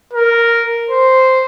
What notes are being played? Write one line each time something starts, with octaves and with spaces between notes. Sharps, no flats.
A#4
C5